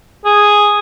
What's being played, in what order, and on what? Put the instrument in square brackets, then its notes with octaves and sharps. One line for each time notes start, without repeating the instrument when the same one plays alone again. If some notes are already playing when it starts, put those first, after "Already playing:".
[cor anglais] G#4